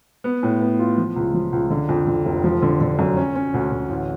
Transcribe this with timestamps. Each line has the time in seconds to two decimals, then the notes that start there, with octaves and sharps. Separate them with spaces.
0.24 B3
0.43 A2
0.61 B3
0.79 F4
0.98 F3
1.16 C#2
1.34 F3
1.53 C#2
1.70 D3
1.89 F2
2.07 D3
2.25 F1
2.44 F3
2.62 D3
2.81 D3
2.99 F#2
3.17 C#4
3.36 C#4
3.54 D2
3.72 D2
3.90 A1